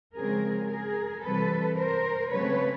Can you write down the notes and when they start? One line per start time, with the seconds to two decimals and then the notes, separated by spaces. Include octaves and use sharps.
0.16 C#3 F3 G#3 C4 G#4 A#4
0.70 G#4 A#4
1.24 C3 E3 G3 A4 B4
1.77 A#4 C5
2.31 C#3 F#3 A3 C4 B4 C#5